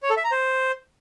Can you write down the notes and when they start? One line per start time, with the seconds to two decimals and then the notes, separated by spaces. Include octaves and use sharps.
0.03 C#5
0.10 A4
0.17 E5
0.24 A#5
0.31 C5